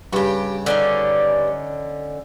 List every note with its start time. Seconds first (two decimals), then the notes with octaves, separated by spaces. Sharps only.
0.13 G2 C#3 F#4 G4
0.66 D3 C#4 D#4 D5